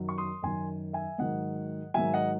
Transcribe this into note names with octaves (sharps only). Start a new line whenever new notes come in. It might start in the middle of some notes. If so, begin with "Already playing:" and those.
Already playing: F#2 D#3 F#3
C#6
C6 D#6
F#2 D#3 F#3 G#5 C6
E5 G#5
G#2 D#3 F#3 D#5 F#5
G#2 D#3 F#3 E5 G#5
D#5 F#5